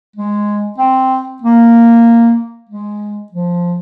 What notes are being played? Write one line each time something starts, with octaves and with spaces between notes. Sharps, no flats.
G#3
C4
A#3
G#3
F3